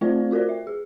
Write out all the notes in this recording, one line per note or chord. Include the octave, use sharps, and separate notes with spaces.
A3 C4 F4 C5 D5
F4 F#4 A#4 C5 D5
E5
G#4